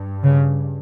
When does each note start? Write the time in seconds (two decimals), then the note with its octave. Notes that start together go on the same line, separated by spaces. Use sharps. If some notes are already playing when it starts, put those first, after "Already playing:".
Already playing: G2
0.22 C#3